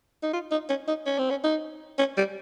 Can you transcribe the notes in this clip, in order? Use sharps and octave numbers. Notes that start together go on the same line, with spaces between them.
D#4
F4
D#4
C#4
D#4
C#4
C4
C#4
D#4
C#4
G3